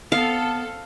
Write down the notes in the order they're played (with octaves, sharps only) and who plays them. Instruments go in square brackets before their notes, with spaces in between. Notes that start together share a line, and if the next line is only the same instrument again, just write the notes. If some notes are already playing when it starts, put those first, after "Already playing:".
[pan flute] B3 [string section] C4 A4 [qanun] F5